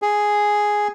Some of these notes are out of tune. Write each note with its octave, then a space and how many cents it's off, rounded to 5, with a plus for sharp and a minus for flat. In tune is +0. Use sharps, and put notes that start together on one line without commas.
G#4 +0